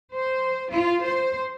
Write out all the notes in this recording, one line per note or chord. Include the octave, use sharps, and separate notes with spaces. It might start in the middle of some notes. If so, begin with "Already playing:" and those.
C5
F4
C5